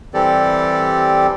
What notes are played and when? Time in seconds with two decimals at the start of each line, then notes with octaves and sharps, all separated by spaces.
0.14 E3 G3 C4 G4 A4 D5